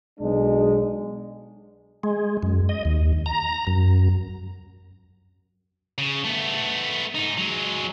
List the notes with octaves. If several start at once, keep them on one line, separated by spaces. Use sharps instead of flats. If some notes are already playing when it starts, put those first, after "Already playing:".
B1 B2 G#3 D4
G#3
F#2
D#5
D#2
A#5
F#2
C#3
A3 B3
G#2 D#4
F#3 G#3